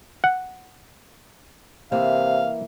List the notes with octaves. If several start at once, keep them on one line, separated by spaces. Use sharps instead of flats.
F#5
C3 E3 A#3 E5 F5